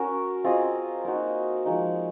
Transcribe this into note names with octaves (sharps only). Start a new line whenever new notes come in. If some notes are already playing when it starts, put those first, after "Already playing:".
Already playing: C#4 F#4 A#4
C4 F4 G#4 D#5
A#3 D#4 F#4
F3 G#3 D#4